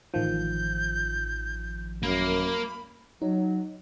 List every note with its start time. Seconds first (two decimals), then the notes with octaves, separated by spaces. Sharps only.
0.14 A1 D#3 F3 G6
2.03 F#2 A#3 B5
3.22 F#3 D#4